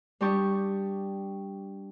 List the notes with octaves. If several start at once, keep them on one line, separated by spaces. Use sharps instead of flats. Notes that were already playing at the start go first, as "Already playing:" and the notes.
G3 D4 G4 C#6 D#6